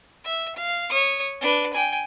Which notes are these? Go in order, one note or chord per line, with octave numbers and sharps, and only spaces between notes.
E5
F5
C#5 D#6
D4 B4
G5 G#5